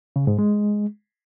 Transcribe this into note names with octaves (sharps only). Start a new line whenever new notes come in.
C#3
G#2
G#3